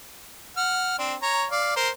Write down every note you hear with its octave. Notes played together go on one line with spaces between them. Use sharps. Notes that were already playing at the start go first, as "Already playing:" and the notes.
F#5 F6
C4 D4
C#5 A#5
D5 F5
A#4 C5